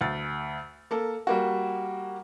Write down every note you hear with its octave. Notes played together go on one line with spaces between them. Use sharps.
D2 A6
A#3 A4
G3 A#3 F#4